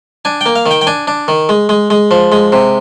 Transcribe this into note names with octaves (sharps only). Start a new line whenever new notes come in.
D4 G#5
A#3 G5
F5
D#3
G5
G5
D4 G#5
D4
D#3
G#3
G#3
G#3
F3
G#3
C3